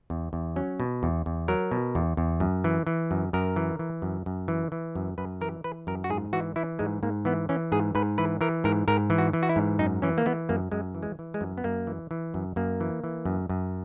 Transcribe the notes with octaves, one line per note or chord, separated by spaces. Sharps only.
E2
E2
F#3 C#4
B2
E2
E2
F#3 A#4
B2
E2
E2
F#2
E3
E3
F#2
F#2 A#4
E3
E3
F#2
F#2
E3
E3
F#2
F#2 B4
E3 A#4
E3 B4
F#2 A#4
F#4
G#2 G#4
E3 F#4
E3 E4
G#2 G#3
G#2 A#3
E3 B3
E3 C#4
G#2 G#4
G#2 B4
E3 B4
E3 A#4
G#2 A#4
G#2 A#4
E3
F#4
E3
F#4
E4
G#2
F#2 D#4
E3 C#4
A#3
E3 B3
F#2 A#3
F#2 G#3
E3
G#3
E3
G#3
F#2
B3
F#2 A#3
E3
E3
F#2
F#2 A#3
E3
E3
F#2
F#2